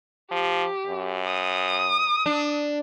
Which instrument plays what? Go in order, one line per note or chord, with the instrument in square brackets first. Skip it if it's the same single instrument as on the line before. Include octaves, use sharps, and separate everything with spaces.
[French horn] F3 [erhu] G4
[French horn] F#2
[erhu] D#6
[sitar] D4